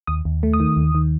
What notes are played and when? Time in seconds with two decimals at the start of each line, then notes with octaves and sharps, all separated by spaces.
0.07 D#2 D#6
0.25 D#2
0.43 A3
0.53 D#6
0.60 D#3
0.77 D#2
0.95 D#3